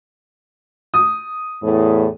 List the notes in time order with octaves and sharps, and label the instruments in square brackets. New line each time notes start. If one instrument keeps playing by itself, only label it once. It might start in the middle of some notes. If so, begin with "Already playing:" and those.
[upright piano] D#6
[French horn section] E2 A2